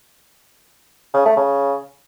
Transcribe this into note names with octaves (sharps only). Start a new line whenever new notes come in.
C#3
A3
C#3